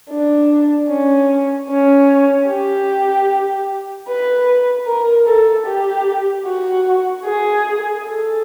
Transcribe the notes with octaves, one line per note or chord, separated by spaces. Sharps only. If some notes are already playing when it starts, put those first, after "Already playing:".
D4
C#4
C#4
G4
B4
A#4
A4
G4
F#4
G#4
A4